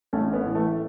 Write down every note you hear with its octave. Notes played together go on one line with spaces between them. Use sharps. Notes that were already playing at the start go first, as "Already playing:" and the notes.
A1 A3 C#4
B3
A2 E3
A3